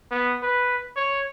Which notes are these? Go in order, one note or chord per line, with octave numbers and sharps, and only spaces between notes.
B3
B4
C#5